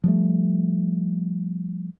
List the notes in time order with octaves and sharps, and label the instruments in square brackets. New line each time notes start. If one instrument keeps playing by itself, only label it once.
[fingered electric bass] F3 G3 A3